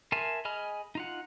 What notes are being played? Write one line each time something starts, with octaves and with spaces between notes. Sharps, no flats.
A#4 E5 G#5 A5 C6
G#4 D#5 G#5 B5 F6
D#4 F4 F#5